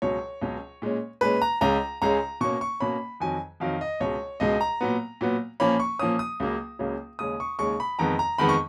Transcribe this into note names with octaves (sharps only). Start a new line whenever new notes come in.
C#2 B2 F#3 C#4 C#5
C#2 B2 F#3 C#4
A#2 G#3 C#4
A#2 G#3 C#4 B4
A#5
C#2 C#3 G#3 C#4 A#5
C#2 C#3 G#3 C#4 A#5
B2 A#3 C#4 C#6
C#6
B2 A#3 C#4 B5
F2 D#3 F#3 G#5
F2 D#3 F#3 F5
D#5
C#2 B2 G#3 C#5
C#2 B2 G#3 D#5
A#5
A#2 F#3 B3
A#2 F#3 B3
A#2 F3 A#3 C#4 B5
C#6
A#2 F3 A#3 C#4 D#6
D#6
C#2 C#3 F#3 A#3 C#4
C#2 C#3 F#3 A#3 C#4
D#2 C#3 G#3 C#4 D#6
C#6
D#2 C#3 G#3 C#4 C#6
B5
F2 D#3 G#3 B3 A#5
A#5
F2 D#3 G#3 B3 B5
C#6